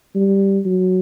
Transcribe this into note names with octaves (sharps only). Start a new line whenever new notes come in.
G3
F#3